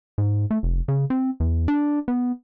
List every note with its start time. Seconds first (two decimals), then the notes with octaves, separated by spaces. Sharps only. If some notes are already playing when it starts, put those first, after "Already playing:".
0.18 G#2
0.51 A3
0.63 F1
0.88 C#3
1.10 C4
1.40 E2
1.68 D4
2.08 B3